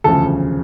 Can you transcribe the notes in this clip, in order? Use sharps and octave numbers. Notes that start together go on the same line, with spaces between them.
E1 D2 C#3 F3 A4